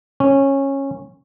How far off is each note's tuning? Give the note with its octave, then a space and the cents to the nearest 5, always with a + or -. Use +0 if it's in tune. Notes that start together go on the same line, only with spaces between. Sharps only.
C#4 -15